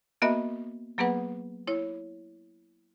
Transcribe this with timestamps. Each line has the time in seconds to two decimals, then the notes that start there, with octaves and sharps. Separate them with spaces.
0.22 A#3 B3 F#4 A#4 D#5 E5
0.98 F#3 A#3 B3 G#4 B4 F#5
1.67 E4 C#5